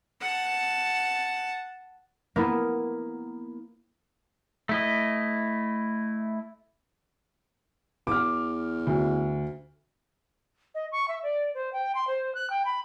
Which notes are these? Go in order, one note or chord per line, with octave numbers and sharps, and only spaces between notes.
F#5 A5
A#3 B3 E4
A3 E4 D#5
E2 D6 F6
D2
D#5
C#6
E5
D5
C5
G5
C6
C5
F#6
G5
B5